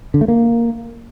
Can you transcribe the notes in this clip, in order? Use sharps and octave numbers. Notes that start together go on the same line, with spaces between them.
D3
A3
A#3